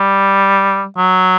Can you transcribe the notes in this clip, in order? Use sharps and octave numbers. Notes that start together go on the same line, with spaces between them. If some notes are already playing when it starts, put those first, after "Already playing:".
Already playing: G3
F#3